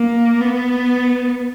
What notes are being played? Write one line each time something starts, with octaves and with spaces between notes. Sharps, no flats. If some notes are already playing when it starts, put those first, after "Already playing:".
Already playing: A#3
B3